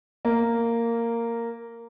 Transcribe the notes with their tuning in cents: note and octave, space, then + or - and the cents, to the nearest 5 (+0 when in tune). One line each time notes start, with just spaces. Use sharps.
A#3 -10